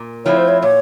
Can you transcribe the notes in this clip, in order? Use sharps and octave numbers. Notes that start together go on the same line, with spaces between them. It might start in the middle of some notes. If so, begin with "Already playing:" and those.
Already playing: A#2
F3 A3 C4 E4 C#5
C5
C#5
A#2 C#5